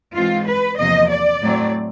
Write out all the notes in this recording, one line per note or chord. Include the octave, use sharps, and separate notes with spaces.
G#2 E3 G#3 C4 F4
B4
E2 C3 F3 A#3 D#5
D5
A2 F#3 A3 C4